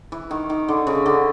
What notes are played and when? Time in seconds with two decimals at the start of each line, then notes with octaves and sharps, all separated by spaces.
0.12 E3
0.31 D#3
0.50 D#3
0.68 D3
0.87 C#3
1.06 D3